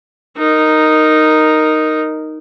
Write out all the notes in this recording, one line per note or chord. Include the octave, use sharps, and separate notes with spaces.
D#4 A#4